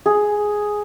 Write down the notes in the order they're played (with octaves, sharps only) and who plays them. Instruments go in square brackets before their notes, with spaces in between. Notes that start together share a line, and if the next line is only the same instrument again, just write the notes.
[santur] G#4